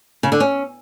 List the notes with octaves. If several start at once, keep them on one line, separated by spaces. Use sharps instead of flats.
C#3
D3
C#4